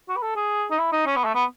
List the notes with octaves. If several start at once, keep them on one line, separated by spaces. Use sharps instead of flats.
F#4
B4
A4
G#4
D#4
E4
D#4
C#4
B3
A3
B3